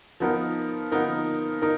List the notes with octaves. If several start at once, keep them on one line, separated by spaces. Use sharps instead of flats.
F3 B3 D#4 A#4
F3 B3 D#4 A#4
D#4 A#4